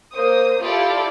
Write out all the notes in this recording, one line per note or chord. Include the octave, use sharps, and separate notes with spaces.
A#3 C5 D#6
E4 F4 G4 A4 D5